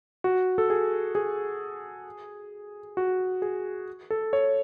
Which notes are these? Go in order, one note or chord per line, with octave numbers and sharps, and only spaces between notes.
F#4
A4
G#4
G#4
F#4
G#4
A4
C#5